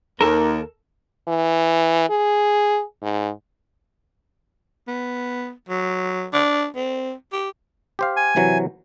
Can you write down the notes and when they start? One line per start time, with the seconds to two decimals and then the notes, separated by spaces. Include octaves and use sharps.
0.21 D#2 A4 A#4
1.28 E3
2.10 G#4
3.02 G#2
4.88 B3
5.69 F#3
6.33 D4
6.76 C4
7.32 G4
7.99 G4 C5 F5
8.17 G#5
8.36 C3 E3 F#3